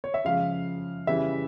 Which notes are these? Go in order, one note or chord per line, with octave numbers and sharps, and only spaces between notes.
C#5
E5
C#3 F3 G#3 F5
C#3 E3 G3 E5